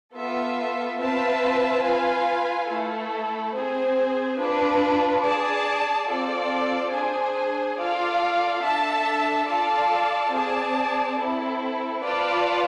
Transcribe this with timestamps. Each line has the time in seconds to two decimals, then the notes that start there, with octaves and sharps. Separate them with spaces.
0.16 B3 F4 A4 E5
1.01 C4 F4 B4 E5 A5
1.85 F4 B4 F5 G#5
2.70 A3 E4 A4
3.55 C4 G#4 C5 G#5
4.39 D4 F4 B4
5.24 G#4 D5 A5
6.09 C4 F4 A4 D5
6.93 D4 G#4 C5 G#5
7.78 F4 A4 D5 F5
8.62 D4 A4 E5 A5
9.47 F4 A4 D5 F5 A5
10.32 C4 G#4 D5 A5
11.17 C4 E4 A4
12.01 F4 B4 D5 A5